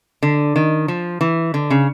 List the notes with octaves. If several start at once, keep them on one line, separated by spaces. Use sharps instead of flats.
D3
D#3
F3
E3
D3
C#3